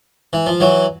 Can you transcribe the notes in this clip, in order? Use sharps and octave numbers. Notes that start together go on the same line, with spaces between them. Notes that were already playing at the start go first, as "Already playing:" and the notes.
E3
F3
E3 F#3